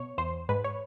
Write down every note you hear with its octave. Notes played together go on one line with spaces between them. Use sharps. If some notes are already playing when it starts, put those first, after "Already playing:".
Already playing: B2 C#5
E2 C5
G#2 B4
C#5